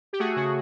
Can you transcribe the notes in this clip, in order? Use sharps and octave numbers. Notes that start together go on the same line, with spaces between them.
G4
A3 F#4 G#4
C#3 F#4